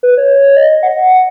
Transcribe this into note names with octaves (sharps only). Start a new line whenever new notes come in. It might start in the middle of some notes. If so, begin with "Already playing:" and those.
B4
C#5
D#5
F#5